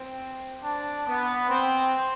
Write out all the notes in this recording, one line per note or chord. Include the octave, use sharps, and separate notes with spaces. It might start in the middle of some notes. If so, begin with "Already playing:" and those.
Already playing: C4
D4
B3
C4